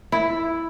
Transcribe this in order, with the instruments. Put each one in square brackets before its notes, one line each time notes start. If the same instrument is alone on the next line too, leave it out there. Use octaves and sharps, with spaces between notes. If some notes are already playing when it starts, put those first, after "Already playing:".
[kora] E4